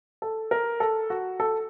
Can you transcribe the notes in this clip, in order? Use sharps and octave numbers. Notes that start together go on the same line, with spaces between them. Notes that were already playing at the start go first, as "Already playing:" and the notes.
A4
A#4
A4
F#4
A4